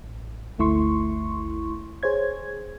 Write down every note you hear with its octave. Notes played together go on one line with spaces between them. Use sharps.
A1
G1 D2 A3 E4 C6 C#6
G#4 C5 C#5 G#6